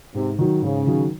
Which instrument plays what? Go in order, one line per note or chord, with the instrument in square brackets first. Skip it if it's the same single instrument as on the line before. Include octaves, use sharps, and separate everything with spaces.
[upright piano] G#2 [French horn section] C3
[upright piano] D#3 F#3
[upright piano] G#2 [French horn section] C#3
[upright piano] D#3 F#3